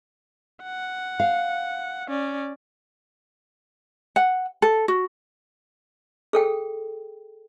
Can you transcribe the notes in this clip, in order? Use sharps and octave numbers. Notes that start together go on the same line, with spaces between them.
F#5
F5
C#4 D5
F#5
A4
F#4
G#4 A4 G5